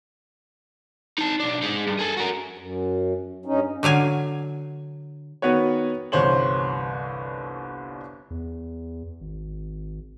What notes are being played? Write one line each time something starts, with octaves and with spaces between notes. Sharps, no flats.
D#4 A5
B1 D4
D#4 G#4
G2
G#4 A4
F#4 A#4
F#2
G2 C#4 D#4
D3 F#3 F5 G#5
D#3 B3 F#4 B4 C#5
G1 C2 E3 C5 C#5 F#7
E2
G#1